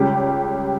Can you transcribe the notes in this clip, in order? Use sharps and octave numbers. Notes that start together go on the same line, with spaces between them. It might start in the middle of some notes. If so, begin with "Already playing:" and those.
Already playing: C#2 C#3 G3 C#4 G4